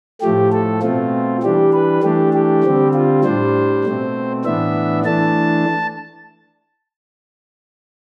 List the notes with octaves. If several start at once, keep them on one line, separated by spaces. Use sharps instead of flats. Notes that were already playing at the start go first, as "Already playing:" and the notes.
A2 F3 A3 G4
A4
B2 A3 C4 F4
E3 G3 D4 G4
B4
E3 A3 D4 G4
G4
D3 G3 C4
F4
A2 G3 D4 C5
B2 A3 C4
A2 E3 B3 D4 E5
E3 A3 D4 A5